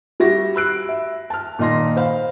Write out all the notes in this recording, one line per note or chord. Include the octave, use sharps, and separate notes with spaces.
G3 F#4 G4 E5 A#6
B5 E6 F#6 C7 D7
E5
A5 F6
A#2 D#3 D#5 C6 A#6
C5 F5 B5